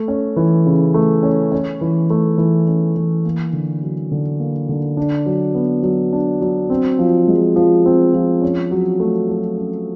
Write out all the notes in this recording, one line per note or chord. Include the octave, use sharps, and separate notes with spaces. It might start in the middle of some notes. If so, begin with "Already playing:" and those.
Already playing: A3
C#4
E3
C#3
A3
C#4
C#4
E3
A3
E3
C#4
E3
A#3
D3
F#3
D3
A#3
D3
D4
F#3
B3
F#3
D4
F#3
C4
F3
G#3
F3
C4
F3
C#4
F#3
A3
F#3
C#4